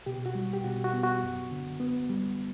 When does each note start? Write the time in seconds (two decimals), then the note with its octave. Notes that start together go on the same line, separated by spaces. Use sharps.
0.06 B2 G4
0.26 F#4
0.35 G3
0.53 G4
0.64 B2 F#4
0.84 F#4
0.94 B3
1.04 F#4
1.22 F#2
1.51 D3
1.80 B3
2.10 G3